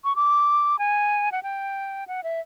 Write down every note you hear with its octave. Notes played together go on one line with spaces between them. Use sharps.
C#6
D6
G#5
F#5
G5
F#5
E5